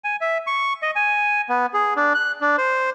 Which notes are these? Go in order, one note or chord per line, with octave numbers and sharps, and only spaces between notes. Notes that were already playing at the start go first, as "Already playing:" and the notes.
G#5
E5
C#6
D#5
G#5
B3
G#4
D4
F#6
D4
C5